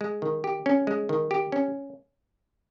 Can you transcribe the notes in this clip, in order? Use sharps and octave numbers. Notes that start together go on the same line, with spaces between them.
G#3
D#3
G4
C#4
G#3
D#3
G4
C#4